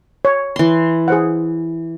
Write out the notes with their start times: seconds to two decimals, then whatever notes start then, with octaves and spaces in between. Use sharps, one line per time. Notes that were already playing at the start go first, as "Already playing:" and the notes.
0.25 C#5
0.56 E3 C6
1.08 G#4 C5 F#5